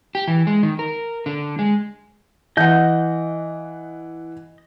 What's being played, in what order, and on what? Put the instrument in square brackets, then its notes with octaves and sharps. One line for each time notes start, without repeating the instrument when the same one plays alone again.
[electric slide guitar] G4
E3
G#3
D#3
A#4
D3
G#3
[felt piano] E3 F#5 [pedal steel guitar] D#5 G6